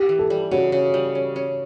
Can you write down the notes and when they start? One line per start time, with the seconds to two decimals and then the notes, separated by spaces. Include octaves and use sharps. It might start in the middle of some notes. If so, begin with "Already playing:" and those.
Already playing: G4
0.09 E3
0.19 A4
0.30 G3
0.51 C#3 F#4
0.72 C#3
0.94 G3
1.15 C#4
1.36 C#4